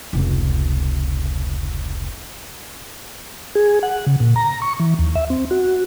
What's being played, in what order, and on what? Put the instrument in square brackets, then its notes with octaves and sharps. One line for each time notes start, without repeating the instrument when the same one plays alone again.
[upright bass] F1 C#2
[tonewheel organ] G#4
F#5
C#3
A#2
A#5
C#6
E3
D#2
E5
C4
F#4